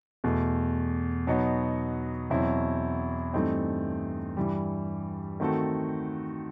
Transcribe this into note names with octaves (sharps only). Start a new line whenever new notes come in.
E2 B2 A3
B2 F#3 B3 D#4 F#4
E2 B2 F#3 C4 E4
G2 E3 A3 C4 D#4
G2 E3 G3
D#3 A3 C4 F#4 A4